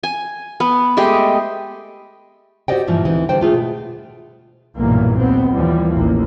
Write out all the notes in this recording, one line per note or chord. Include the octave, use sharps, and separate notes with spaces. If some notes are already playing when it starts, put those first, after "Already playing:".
G#5
B3
G#3 A3 G4 D#5
F#4 G4 C5 D5 D#5 G5
G2 A#2 E3 F3
D2 E3 C4 D#4
D3 G3 C5 G5
A3 F4 G#4
B2
B1 G2 A#2 E3 A#3
D#2 B3 C4
D#2 E3 F3 G3
A1 D#2 A#3